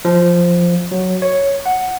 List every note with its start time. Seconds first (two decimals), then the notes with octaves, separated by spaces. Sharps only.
0.05 F3
0.91 F#3
1.22 C#5
1.66 F#5